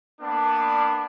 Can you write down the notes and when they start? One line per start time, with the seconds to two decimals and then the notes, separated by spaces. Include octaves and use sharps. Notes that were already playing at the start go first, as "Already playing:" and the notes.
0.20 A#3 B3 D4